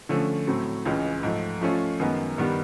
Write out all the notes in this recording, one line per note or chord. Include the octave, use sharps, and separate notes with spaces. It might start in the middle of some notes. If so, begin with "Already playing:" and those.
D3 F3 A3 C#4
A2 F#3 A3 C4
C#2 C#3 E3 G#3
G#2 F3 A3
F3 A3 C#4 F4
F#2 D#3 G#3 B3
G2 D#3 G3 B3